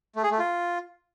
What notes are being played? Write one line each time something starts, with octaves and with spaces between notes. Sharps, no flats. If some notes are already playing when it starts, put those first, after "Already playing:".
A3
G#4
A3
F4